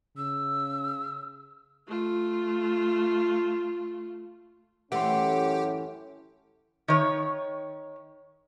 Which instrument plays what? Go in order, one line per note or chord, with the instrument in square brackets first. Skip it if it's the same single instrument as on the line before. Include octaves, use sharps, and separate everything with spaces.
[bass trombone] C#3 [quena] E6
[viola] A3 F4
[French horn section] F#2 A2 C#4 [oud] E3 A3 [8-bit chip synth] G4 [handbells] F#5 C6
[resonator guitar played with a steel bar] D#3 C#5